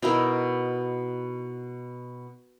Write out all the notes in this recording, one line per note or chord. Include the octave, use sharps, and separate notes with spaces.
B2 D#4 E4 A#4